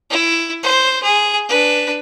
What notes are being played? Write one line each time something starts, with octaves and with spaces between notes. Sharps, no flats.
E4
C5
G#4
D4 B4